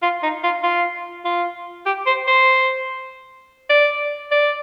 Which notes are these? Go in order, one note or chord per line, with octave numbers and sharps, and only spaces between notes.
F4
D#4
F4
F4
F4
G4
C5
C5
D5
D5